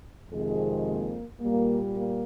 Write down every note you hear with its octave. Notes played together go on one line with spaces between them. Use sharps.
F2 C3 D#3 G#3 G#4
A#3
A#2 G3 A#3
A#3